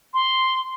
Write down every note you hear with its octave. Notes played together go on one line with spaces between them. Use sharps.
C6